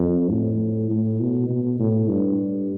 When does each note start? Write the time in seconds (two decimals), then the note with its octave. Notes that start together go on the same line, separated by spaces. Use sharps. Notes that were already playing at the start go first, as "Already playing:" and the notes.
Already playing: F2
0.31 A2
0.90 A2
1.20 B2
1.49 B2
1.80 A2
2.08 G2